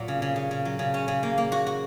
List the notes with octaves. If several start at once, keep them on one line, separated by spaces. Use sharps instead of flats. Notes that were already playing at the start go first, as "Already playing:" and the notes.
Already playing: A#2 F#3 A#3
C#3
C#3
C#3
C#3
F#3
C#3
C#4
C#3
A#3
A#3
F#4
F#4